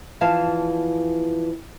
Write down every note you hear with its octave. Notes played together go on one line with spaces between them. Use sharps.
E2 E3 F3 F5 A5